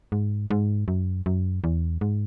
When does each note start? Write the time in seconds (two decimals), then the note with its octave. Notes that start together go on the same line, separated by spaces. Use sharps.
0.12 G#2
0.50 G#2
0.88 F#2
1.26 F#2
1.64 E2
2.01 G#2